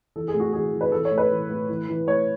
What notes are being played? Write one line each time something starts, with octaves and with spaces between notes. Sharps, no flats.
E3 A4
G#4
A2
F#4
E3 G#4
E3
B4
E3 A4
C#5
A2
B4
E3
A2
E3
E3
A2 C#5